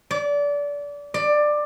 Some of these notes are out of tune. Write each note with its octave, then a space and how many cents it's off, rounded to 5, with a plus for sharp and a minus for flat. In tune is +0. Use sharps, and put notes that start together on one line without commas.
D5 -25
D5 +15